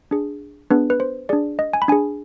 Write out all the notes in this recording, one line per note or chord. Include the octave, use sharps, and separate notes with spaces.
D4 G#4
B3 D4 G#4 B4
B4
C5
D4 G#4 D5
D#5
G#5
B5
D4 G#4 G#5